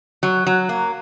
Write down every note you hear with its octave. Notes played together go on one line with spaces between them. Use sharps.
F#3
F#3
A#3